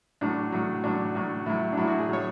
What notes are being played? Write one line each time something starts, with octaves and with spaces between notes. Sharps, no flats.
A2 F#3 D4
A2 F#3
A2 F#3 D4
A2 F#3
A2 F#3 E4
D4
A2 F#3 E4
F#4
G#4
A2 F#3 C#5